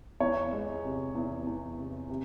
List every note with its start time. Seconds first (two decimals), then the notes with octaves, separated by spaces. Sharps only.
0.20 E2 C#5
0.52 G#3
0.84 C3
1.15 E2
1.47 E2
1.78 C3
2.09 C3